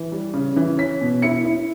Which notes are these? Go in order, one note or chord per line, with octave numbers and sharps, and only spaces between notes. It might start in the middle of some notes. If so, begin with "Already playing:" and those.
Already playing: E3
G3
C#3
E3
C#4 B6
B2
E4 C#7
E4